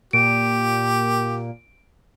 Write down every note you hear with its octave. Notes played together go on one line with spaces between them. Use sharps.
A#2 G4 D7